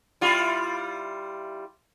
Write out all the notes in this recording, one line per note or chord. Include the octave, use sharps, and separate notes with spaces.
G3 E4 F4